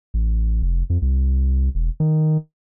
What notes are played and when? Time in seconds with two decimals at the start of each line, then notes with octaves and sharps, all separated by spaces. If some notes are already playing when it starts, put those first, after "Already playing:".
0.14 A1
0.62 F1
0.90 F2
1.02 C2
1.75 E1
2.00 D#3